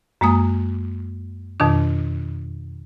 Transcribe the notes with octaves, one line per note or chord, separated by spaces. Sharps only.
F#2 G#3 A#3 D#6
F2 B2 D#3 D4